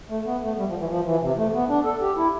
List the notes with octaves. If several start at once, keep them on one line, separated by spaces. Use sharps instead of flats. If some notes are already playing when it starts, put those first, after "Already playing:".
A3
B3
A3
G3
F3
E3
F3
E3
C3
A3
B3
D4
A4
G4
E4